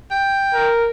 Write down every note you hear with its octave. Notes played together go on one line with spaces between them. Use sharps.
G5
A#4